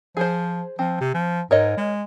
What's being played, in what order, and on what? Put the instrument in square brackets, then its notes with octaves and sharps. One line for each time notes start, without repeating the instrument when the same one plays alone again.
[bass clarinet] F3 [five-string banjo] G#4 C5
[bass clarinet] F3 [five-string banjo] C4
[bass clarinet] C3
F3
[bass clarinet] G#2 [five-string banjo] A#4 C#5 D#5
[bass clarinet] G#3